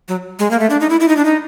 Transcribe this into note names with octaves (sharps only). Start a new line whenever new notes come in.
F#3
G#3
A#3
A3
D4
D#4
E4
E4
D#4
D4
D#4